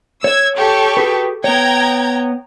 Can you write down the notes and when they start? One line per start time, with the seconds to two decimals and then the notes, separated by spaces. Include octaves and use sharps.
0.24 C#5 E6 G#6
0.57 G4 A4 C#6
0.97 F#4 G#4 B4
1.44 B3 C#5 G5 A#5 G#6